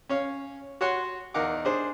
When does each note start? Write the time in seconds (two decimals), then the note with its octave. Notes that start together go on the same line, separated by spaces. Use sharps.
0.09 C#4 C#5 F5
0.81 F#4 C#5 F#5 C6
1.34 E2 D#4 A#4 F5 F#5 D6
1.65 D4 G#4 C5